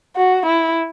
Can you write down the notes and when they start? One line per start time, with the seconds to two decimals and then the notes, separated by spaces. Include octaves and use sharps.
0.16 F#4
0.46 E4